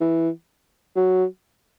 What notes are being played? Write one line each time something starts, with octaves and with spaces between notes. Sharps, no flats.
E3
F#3